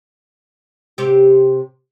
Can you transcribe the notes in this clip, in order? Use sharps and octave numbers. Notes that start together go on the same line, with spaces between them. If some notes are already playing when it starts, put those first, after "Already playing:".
C3 G4